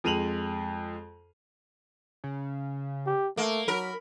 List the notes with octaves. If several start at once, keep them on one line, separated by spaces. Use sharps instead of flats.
F2 G#3 D#7 F7 F#7
C#3
G4
A3 A#3
F#3 A#4 B5